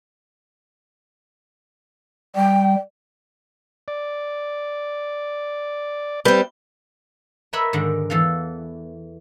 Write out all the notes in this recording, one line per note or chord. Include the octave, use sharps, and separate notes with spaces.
G3 G5
D5
G3 C4 B4
A#4 B4 C#5 D#5 E5 B5
G#2 D3 D#3
E2 E3 A4 F5